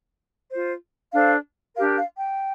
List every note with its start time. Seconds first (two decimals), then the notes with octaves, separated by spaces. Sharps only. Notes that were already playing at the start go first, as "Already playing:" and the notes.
0.51 F4 C5
1.13 D4 A4 C5 F5
1.76 D4 G4 A#4 F5
1.98 F5
2.18 G5